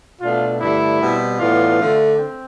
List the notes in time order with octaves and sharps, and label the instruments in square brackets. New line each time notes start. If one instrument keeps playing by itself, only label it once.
[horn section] B2 A3 D4 F4
G2 D3 A3 D4 E4
B2 G3 C4
A2 E3 B3 D4 F4
D3 A3 D4
C4